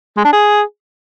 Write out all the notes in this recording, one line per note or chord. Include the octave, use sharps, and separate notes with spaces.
G#3
D4
G#4